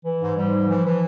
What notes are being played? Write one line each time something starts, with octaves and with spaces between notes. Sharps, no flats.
E3
G#2
G#2 G3
E3
E3 F3
E3